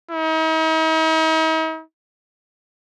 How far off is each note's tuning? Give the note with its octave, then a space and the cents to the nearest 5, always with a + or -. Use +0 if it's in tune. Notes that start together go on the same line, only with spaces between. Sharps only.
D#4 +45